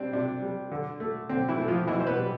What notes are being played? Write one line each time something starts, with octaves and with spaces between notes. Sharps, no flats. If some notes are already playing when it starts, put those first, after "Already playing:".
Already playing: G3 C4 D4
C3 D4
G3
D3
A3
D3 C4
E3 E4
A3
F3 F4
B2 E3 E4
C5
B3 B4
G3